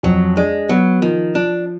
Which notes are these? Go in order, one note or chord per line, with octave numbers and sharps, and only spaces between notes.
F2 F#3
G#3 D4
F#3 B3
D#3 F3
F3 D4